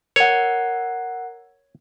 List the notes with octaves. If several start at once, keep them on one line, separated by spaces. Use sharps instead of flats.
A#4 C#5 F#5